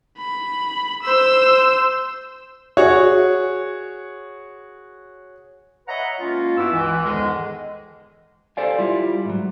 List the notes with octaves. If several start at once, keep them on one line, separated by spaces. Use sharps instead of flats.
B5
C5 E6
F#4 G#4 C#5
B4 C#5 D#5 E5 F#5 A#5
G#3 A#3 C#4 F4
G2 B3 E4 F#4 D6 E6
C#2 E3
E2 G#2 D3 D#3 G#3
G4 A4 C5 D5 F5 G#5
G3 E4 F4
G#2 F#3